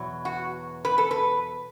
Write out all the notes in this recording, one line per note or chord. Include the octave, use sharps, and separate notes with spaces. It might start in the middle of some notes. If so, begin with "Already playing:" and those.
Already playing: E2 B2 F#3
F#4
B4
A4
B4